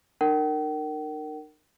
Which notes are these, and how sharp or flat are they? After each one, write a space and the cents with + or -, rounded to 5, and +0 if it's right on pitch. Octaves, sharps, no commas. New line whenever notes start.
D#4 -45 A#4 -15 G5 -45